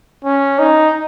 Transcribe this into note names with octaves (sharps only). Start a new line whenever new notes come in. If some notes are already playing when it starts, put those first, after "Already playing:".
C#4
D#4